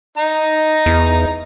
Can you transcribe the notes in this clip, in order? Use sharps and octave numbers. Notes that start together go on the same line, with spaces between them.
D#4 A#5
E2